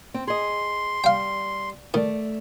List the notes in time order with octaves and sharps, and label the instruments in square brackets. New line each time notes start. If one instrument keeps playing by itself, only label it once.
[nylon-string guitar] C4
[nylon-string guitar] G#4 D#5 [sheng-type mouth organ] C6
[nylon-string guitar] G3 [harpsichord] F5 G5
[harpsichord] D#3 [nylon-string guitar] A3 D5